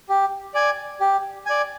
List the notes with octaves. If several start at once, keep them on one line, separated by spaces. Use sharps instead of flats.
G4
D5 G#5
G4
D5 G#5